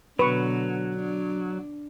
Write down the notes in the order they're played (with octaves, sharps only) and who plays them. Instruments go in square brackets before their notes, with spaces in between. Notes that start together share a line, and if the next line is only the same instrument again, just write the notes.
[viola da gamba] B2 D3 [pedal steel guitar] F#3 [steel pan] B4 C#6
[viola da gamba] D4